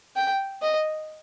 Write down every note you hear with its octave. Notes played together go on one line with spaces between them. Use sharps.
G5
D#5